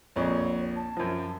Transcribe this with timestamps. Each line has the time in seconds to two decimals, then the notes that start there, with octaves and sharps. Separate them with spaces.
0.16 A#1 F2 C#5
0.76 A5
0.97 F#2 F3